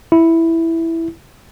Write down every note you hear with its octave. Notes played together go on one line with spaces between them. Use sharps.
E4